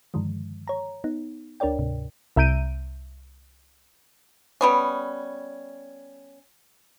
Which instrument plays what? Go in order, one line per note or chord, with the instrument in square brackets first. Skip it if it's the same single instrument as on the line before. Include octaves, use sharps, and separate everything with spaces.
[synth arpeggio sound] G2 D3 D#3 F3 G#3
C#5 A#5
B3 D#4
D2 D4 A#4 C#5 D5 G5
D2 G#2 C3
C2 E5 A#5 G6 D7 D#7
[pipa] G3 B3 C#4